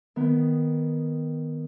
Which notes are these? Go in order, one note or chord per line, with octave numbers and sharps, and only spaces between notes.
D#3 B3